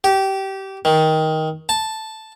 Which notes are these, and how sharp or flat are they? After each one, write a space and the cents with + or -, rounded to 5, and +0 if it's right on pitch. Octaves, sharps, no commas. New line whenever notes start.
G4 -20
D#3 +15
A5 +0